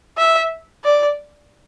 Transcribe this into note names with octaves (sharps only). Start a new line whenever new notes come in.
E5
D5